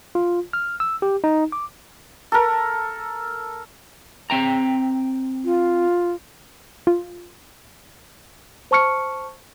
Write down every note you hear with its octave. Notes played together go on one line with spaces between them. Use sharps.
F4
F6
E6
G4
D#4
D6
A4 A#4
C4 G5 A#5
F4
F4
C5 A5 C#6 F6 C#7